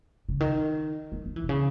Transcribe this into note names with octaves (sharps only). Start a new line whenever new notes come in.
C#3
D#3
E3
F#3
E3
B2
C#3